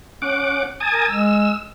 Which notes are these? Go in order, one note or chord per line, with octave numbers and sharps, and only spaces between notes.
C#4 F#5 D6
G#5 A5 D#6
A#4
G#3 E6